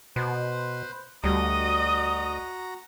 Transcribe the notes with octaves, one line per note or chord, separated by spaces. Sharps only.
B2 B4 C5
D2 G3 F#4 D#5 A#5